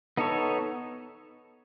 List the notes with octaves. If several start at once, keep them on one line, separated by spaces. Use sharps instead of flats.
B3 D#4 A4 C#5